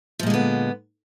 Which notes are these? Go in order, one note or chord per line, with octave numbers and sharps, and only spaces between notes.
A#2 D3 F3 G#3 B3